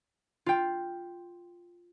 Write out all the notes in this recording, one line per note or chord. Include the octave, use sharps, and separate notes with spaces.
F4 G5